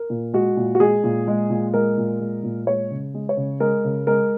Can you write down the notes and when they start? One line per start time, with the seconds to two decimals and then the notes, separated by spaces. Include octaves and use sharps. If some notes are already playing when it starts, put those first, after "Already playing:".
Already playing: A#4
0.10 A#2
0.33 G#3 F#4
0.57 A#2
0.75 F#4
0.80 G#3 G#4
1.04 A#2
1.28 G#3
1.50 A#2
1.74 G#3 A#4
1.97 A#2
2.20 G#3
2.43 A#2
2.67 G#3 C#5
2.91 C#3
3.14 G#3
3.29 C#5
3.37 C#3
3.60 G#3 A#4
3.84 C#3
4.07 G#3 A#4